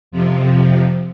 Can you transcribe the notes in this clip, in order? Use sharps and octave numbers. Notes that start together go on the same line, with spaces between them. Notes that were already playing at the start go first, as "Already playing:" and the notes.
F2 C3 F3